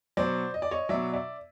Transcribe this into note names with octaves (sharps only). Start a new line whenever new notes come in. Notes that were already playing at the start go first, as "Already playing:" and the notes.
B2 F#3 C5 D5
D#5
D5
C#5 D#5
B2 F#3 D5 E5
D5 E5